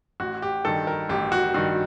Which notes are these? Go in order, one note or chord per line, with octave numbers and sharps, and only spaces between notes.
A1 F#4
G4
G2 D#3 A4
A#4
A1 G4
F#4
G2 D#3 F#4